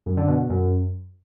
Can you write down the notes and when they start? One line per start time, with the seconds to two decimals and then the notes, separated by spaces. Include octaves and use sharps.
0.06 F#2
0.17 D3
0.28 B2
0.39 B2
0.49 F#2